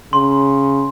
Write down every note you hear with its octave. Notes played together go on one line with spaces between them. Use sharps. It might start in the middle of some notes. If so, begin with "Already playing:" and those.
C#3 C6